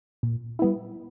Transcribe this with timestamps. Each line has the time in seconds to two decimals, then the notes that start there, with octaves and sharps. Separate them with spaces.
0.23 A#2
0.59 G3 B3 E4